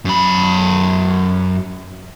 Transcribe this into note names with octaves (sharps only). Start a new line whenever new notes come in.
F#2 B5